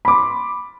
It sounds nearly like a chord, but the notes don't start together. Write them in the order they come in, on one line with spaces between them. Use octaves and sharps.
B5 D6 C6